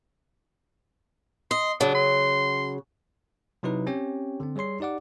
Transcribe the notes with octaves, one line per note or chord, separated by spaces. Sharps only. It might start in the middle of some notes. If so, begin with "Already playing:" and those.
D#5 C6
C#3 F#3 D4
C6
C3 F#3 D#4 E4 B4
C4 C#4 G4 C#5 G5
D3 C4
G3 G#4 C#5 C6 C7
D#4 G4 D5 F#5 D6